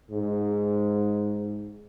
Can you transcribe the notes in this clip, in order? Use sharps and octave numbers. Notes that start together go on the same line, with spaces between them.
G#2